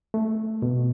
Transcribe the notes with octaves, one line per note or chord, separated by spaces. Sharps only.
A3
B2